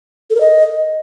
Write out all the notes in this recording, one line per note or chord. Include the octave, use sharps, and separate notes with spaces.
A4
A#4
D#5